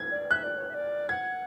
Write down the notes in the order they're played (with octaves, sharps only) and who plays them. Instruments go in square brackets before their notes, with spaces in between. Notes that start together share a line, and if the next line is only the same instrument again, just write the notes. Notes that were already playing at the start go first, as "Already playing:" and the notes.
Already playing: [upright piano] G#6
[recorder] D5
[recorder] E5 [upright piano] F#6
[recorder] D5
C#5
E5
D5
[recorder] F#5 [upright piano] G#6